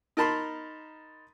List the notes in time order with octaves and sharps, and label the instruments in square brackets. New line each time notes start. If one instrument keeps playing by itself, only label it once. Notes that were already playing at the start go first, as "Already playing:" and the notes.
[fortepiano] D#4 A#4 A5 B5 C6